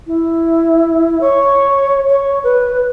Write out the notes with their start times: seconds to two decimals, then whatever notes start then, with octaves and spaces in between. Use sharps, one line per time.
0.07 E4
1.21 C#5
2.09 C#5
2.44 B4